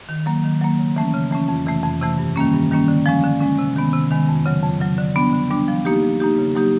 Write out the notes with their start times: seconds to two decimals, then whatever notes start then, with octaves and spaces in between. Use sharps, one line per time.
0.09 D#3
0.26 F#3 A#3
0.44 D#3
0.61 F#3 A#3
0.79 C#3
0.96 E3 A3 C#4
1.14 C#3
1.31 E3 A3 C#4
1.48 F2
1.66 C3 E3 A3
1.83 F2
2.01 C3 E3 A3
2.18 G2
2.36 D#3 G3 A#3 C#4
2.53 G2
2.71 D#3 G3 A#3 C#4
2.88 D3
3.06 F3 G#3 C#4
3.23 D3
3.40 F3 G#3 C#4
3.58 C3
3.76 D#3 G#3 B3
3.93 C3
4.11 D#3 G#3 B3
4.29 F2
4.46 C#3 F#3
4.63 F2
4.80 C#3 F#3
4.98 D3
5.16 G3 B3 D4
5.33 D3
5.50 G3 B3 D4
5.68 F3
5.85 A#3 D#4 G4
6.03 F3
6.20 A#3 D#4 G4
6.38 C#3
6.55 F#3 A#3 D#4 G4